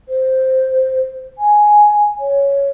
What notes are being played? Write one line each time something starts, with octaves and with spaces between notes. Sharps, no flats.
C5
G#5
C#5